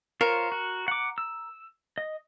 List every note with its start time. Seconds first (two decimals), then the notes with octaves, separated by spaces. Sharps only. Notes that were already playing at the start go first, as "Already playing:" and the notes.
0.21 F4 A#4 C5 C#5
0.52 F#4
0.88 F#5 D6
1.18 E6
1.98 D#5